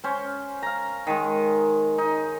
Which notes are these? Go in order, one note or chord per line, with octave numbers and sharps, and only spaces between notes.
C#4 C5
F5 A#5
D#3 G#3
D#4